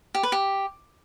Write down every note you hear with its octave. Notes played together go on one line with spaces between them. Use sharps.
G4
B4
G4